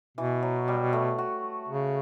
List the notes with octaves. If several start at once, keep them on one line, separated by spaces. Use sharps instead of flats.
B2 E3
F#3
G3
A3
F#4
C#3